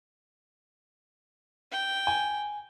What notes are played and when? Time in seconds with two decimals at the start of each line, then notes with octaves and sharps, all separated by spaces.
1.72 G5
2.07 G#5